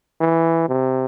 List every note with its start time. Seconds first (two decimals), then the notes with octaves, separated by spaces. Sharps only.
0.21 E3
0.69 C3